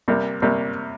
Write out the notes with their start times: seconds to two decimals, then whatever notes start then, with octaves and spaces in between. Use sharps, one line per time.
0.08 C3 G3 A#3
0.42 C3 G3 A#3